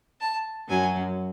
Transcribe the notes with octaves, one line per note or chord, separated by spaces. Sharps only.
A5
F#2 F#3 G#5